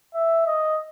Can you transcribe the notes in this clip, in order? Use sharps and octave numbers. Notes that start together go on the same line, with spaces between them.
E5
D#5